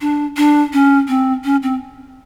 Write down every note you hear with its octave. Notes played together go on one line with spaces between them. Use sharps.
D4
D4
C#4
C4
C#4
C4